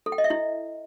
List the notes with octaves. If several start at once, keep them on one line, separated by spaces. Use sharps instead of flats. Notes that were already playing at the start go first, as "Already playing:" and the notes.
A4
G5
D#5
E5
E4